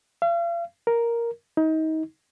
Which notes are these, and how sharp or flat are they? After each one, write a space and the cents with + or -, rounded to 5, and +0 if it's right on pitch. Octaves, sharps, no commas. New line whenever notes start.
F5 -40
A#4 +0
D#4 +30